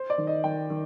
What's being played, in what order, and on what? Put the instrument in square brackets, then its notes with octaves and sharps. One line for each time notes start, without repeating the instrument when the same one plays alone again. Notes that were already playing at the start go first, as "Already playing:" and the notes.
Already playing: [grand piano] C5
D5
[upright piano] D#3
[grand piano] D#5
[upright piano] D#3 [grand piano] G5
[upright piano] D#3